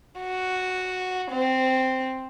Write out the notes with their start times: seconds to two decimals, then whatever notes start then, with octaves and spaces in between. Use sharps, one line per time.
0.19 F#4
1.31 C4